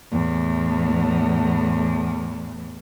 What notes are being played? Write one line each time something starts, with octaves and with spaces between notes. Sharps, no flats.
E2 A2